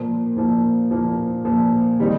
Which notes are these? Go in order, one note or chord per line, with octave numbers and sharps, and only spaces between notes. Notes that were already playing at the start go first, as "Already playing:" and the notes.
Already playing: A#2 F3 A#3
A#2 F3 A#3
A#2 F3 A#3
A#2 F3 A#3
D#3 G3 C4 D#4